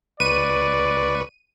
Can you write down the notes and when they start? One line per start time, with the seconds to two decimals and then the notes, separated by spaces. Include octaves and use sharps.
0.20 C#2 B4 D5 C#6 D#7